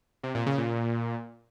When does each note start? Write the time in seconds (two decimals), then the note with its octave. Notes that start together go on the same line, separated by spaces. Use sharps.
0.23 C3
0.35 A#2
0.47 C#3
0.58 A#2